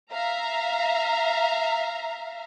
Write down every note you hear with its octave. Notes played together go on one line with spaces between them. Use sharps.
E5 F5 A#5